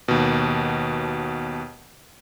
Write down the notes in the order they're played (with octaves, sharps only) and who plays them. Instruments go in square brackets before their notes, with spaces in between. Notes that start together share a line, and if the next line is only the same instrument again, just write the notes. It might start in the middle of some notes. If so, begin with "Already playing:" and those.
[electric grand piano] D#2 B2